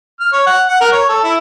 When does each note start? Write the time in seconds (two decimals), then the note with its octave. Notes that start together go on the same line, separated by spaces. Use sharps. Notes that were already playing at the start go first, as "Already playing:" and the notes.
0.20 F6
0.33 C#5
0.46 F#5
0.68 F#5
0.81 A#4
0.93 C#5
1.09 A4
1.24 E4